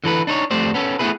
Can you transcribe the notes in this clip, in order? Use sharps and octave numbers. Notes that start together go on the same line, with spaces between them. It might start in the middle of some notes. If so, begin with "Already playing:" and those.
D3 E3 A4 B4
D4 D#4 C5 C#5
F2 G3 A3 C5 D5
B3 C#4 A4
A3 B3 C4 E4 G#4 B4